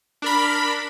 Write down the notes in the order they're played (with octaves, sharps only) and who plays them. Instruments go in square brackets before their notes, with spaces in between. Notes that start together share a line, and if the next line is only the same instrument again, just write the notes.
[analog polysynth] D4 A#4 B5